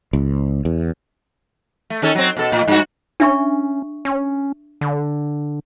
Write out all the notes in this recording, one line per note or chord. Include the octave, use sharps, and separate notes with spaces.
C#2
E2
A3
D#3 C#4 A4
F#3 C4
B2 A4
A2
G2 F#4
C#4 D4 E5 C#6
C#4
D3